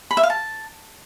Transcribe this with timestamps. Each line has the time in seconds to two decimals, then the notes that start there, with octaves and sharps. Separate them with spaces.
0.11 B5
0.17 E5
0.23 F5
0.30 A5